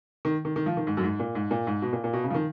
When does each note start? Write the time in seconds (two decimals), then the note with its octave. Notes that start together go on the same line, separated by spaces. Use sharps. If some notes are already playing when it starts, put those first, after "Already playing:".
0.25 D#3
0.45 D#3
0.56 D#3
0.66 F3
0.77 D#3
0.87 G#2
0.97 F#2
1.03 G#2
1.19 A#2
1.35 G#2
1.51 A#2
1.67 G#2
1.82 B2
1.93 A#2
2.04 A#2
2.13 B2
2.24 C#3
2.30 F3
2.34 D#3